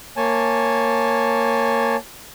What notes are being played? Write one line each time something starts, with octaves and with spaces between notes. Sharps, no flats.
A#3 C#5 G#5 A5